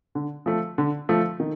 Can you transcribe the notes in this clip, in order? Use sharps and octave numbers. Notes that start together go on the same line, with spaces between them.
D3
F3 A3
D3
F3 A3
D#3